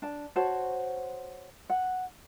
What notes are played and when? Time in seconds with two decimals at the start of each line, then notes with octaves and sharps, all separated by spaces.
0.02 D4 A5
0.36 F#4 C5 C#5 A5
1.70 F#5